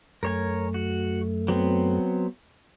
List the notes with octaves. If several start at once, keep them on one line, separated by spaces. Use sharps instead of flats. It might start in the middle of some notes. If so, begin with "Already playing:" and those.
F#2 A3 A#4 C#5 G#5
F#4
F#3 B3 C4